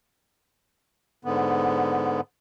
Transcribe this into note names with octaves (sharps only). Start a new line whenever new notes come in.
G#2 D3 B3